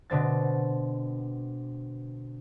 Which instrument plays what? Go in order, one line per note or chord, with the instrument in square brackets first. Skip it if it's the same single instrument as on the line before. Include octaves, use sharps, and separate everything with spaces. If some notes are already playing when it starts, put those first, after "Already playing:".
[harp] B2 D3 C4 A6